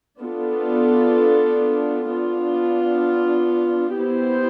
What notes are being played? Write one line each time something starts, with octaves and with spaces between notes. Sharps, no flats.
B3 D4 F4 A4
B3 D4 F4
B3 E4 G4 C5